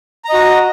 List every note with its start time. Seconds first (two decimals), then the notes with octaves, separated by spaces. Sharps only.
0.25 A#5
0.29 D#5
0.34 F#4